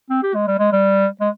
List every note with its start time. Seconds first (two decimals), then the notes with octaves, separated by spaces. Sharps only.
0.10 C4
0.23 G4
0.35 G#3
0.47 G3
0.59 G#3
0.72 G3
1.20 G#3